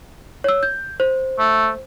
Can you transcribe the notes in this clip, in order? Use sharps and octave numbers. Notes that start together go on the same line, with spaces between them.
C#5 E6
G6
C5
A3